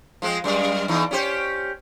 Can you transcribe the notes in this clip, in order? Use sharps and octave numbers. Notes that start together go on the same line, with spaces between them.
F3 G#3 C4
F#2 G3 D5
E2 E3 D#4
C#4 G4 C5